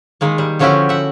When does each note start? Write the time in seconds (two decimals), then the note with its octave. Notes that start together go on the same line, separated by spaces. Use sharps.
0.21 D#3 G#3 A#3
0.38 G3
0.59 D3 F3 C#4 E4 F#4 G4
0.89 E5 F#5